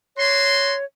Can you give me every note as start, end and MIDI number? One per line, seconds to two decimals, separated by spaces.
0.17 0.74 66
0.17 0.84 73
0.17 0.74 84